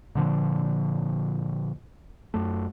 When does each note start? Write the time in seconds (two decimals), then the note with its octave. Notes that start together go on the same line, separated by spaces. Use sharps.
0.15 A#2 D3 F3
2.34 F#2 A3